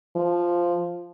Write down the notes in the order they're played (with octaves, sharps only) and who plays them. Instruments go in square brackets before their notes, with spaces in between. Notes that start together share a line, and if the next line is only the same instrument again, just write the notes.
[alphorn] F3